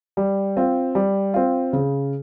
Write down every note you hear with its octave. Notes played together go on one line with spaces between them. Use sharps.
G3
C4 F4
G3
C4 F4
C#3